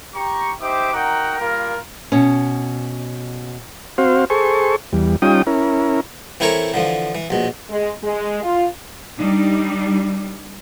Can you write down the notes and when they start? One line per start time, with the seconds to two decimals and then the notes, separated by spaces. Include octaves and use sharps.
0.14 G4 A#5 C#6
0.61 D#4 G4 C5 E5 D6
0.93 D#4 F#4 A#4 F#5 G5 A#5
1.38 G3 A#3 F4 A#4
2.12 B2 C#4
3.98 C4 F#4 C5 F5
4.30 G#4 A4 C5 C#6
4.93 E2 G3
5.22 G3 C#4 D#4 F4 G5 D#6
5.47 C#4 E4 A#4
6.40 E3 C4 E4 A4 A#4 C#5
6.74 D3 E3 F3
7.15 E3
7.30 A#1 B2
7.70 G#3
8.03 G#3
8.43 F4
9.20 G3 D4 D#4